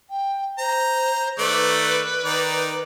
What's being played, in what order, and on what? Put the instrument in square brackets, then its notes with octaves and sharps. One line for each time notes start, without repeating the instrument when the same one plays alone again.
[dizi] G5
[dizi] C5 [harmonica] A#5
[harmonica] D#3 A3 D5 [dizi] B4
[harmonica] D#3 D#4 D5